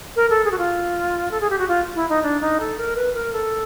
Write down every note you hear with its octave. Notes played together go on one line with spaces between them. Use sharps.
A#4
A4
G#4
F#4
F4
A4
G#4
G4
F#4
F4
E4
D#4
D4
D#4
A4
A#4
B4
A#4
A4